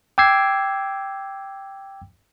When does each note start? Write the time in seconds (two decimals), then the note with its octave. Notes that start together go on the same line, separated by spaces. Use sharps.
0.18 G5 D6 E6 G#6 C7